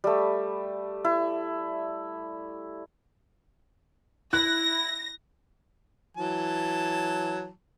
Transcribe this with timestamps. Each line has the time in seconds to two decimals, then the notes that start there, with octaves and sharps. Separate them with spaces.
0.04 G3 A3
1.04 E4
4.33 E4 F#6 A#6
6.17 E3 F#3 A5